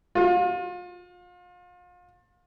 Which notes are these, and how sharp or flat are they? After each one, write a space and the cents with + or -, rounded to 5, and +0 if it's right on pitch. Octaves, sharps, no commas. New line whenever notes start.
F4 +35